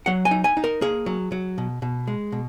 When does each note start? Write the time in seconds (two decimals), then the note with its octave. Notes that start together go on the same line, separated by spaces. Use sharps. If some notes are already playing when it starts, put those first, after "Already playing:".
0.06 F#3 F#5
0.25 G#5
0.31 D#4
0.44 G#5
0.57 D#4
0.64 A#4
0.81 A#3 G#4
1.06 F#3
1.32 F#3
1.58 B2
1.82 B2
2.07 G#3
2.32 B2